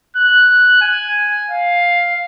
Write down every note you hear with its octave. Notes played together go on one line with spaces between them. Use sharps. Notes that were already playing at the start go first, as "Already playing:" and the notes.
F#6
G#5
F5